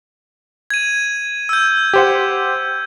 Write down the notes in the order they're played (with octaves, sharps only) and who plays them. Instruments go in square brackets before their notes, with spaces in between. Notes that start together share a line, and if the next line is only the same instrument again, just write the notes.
[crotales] G#6 D#7
E6 G6
[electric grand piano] G4 C5 F#5